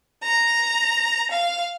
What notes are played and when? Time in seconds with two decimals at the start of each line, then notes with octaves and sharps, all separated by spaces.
0.23 A#5
1.31 F5